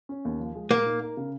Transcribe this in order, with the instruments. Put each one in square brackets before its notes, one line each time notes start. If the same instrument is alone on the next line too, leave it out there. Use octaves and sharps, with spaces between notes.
[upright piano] C#4
D#2
F3
G#3
[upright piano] A#2 [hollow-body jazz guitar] A#3
[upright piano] D#4
A#4
C#3